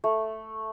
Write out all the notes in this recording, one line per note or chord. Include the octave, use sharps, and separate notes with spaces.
A3